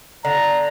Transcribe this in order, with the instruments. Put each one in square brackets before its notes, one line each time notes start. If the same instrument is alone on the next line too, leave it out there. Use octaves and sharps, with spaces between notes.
[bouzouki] D3 [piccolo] A#5